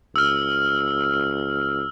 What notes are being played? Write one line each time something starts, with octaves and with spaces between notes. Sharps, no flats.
C#2 E6 F6